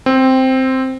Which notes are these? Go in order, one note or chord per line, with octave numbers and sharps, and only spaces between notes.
C4